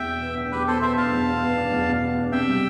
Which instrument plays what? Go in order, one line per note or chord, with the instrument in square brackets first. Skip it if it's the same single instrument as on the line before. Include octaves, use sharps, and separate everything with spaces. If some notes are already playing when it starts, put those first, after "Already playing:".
Already playing: [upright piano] E2 [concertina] E5 G5
[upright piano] B2
B3
D4
[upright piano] E2 [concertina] G4 B4
[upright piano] B2 [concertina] A4 C5
[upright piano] B3 [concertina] C5 E5
[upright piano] D4 [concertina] F5 A5
[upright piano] E2
B2
B3
D4
E2
B2
B3
D4
[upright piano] C3 [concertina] E5 G5
[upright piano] G3